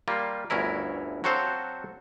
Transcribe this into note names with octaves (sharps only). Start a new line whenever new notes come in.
G3 A#3 F4
G1 D2 C#4 E4 A#4
F#3 C4 F#4 A4 C5 F5